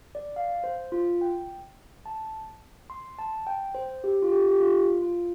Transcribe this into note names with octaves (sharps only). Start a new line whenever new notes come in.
D5
F5
C5
F4
G5
A5
C6
A5
G5
C5
G4
F4
G4
G4
F4
F4